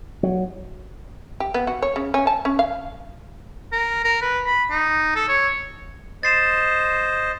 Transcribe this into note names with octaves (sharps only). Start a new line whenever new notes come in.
F#3
G4
B3
F#4
C#5
C#3
C#4
A5
C#4
F5
A#4
A#4
B4
B5
D#4
A4
C#5
C5 D#5 A6 C7 E7